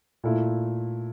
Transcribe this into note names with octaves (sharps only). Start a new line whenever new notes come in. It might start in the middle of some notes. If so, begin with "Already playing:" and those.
A#2 A3 E4